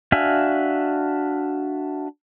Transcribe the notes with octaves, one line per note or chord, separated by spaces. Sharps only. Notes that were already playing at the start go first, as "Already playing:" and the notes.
D4 F#4 E5 F5 G#5